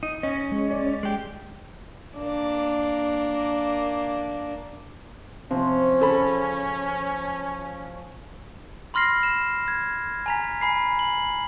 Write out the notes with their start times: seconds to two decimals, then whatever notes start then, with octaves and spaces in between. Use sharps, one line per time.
0.03 D#4
0.23 C#4 D#5
0.52 G#3
0.71 D5
1.03 G#3 G4
2.19 A#3 D4
5.51 C3 F3 C#4
6.00 C#3 A4 B5
8.94 B5 C6 F6 A#6 C7
9.23 E7
9.68 G#6
10.26 G#5 A#5 B6
10.61 G#5 B5 C7
10.99 F#7